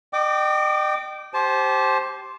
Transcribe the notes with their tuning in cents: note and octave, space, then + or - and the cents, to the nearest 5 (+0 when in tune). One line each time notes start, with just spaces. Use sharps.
D#5 -40 G5 -20 D6 +0
G4 -10 C5 +10 A5 -30